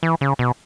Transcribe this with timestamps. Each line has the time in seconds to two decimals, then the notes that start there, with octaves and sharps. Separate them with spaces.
0.03 E3
0.21 C#3
0.39 B2